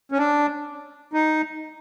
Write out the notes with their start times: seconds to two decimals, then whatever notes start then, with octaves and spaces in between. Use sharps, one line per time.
0.12 C#4
0.18 D4
1.13 D#4